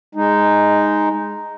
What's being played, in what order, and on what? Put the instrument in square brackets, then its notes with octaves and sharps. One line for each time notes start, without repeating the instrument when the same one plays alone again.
[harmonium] G#3 D#4